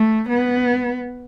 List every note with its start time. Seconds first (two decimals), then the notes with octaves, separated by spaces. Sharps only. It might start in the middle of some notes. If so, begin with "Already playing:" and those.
Already playing: A3
0.29 B3